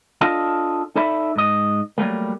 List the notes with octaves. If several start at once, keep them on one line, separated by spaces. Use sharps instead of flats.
D4 F4 A4 D#5
D#4 A4 D5 E5 B5
G#2 D#5
F#3 G3 A3 A#3